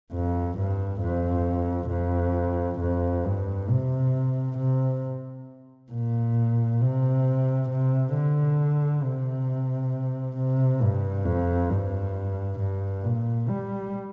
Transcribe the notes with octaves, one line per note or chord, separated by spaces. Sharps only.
F2
G2
F2
F2
F2
G2
C3
C3
A#2
C3
C3
D3
C3
C3
G2
F2
G2
G2
A#2
G3